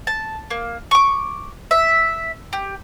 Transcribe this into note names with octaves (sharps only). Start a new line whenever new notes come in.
A5
A#3
C#6 D6
E5
G4